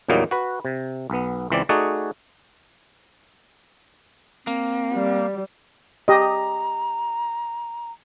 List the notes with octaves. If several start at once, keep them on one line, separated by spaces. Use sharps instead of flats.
E2 A#2 F#3 G3 A#3 D#4
F#4 B4
C3
B1 B3
C#2 E3 C4 D5
A3 D#4 F#4 G#4 D5 F#5
A#3 C4
G3
G4 D#5 A#5